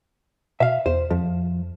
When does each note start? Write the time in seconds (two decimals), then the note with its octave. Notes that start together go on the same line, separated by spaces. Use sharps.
0.60 B2 E5 F5
0.86 E2 C5
1.11 F2 F3